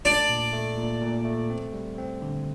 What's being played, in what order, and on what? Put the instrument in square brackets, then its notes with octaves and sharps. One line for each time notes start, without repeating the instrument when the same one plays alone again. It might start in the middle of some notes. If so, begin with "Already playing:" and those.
[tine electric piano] A3 [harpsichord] D4 D5
[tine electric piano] A#2
A3
A#2
A#2
A3
C4
G3
C4
D3